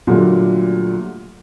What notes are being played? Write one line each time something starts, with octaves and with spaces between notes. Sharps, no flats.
A#2 D3 F#3 G3 A3